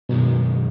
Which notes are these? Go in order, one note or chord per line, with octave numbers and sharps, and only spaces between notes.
F#2 B2 D#3 G#3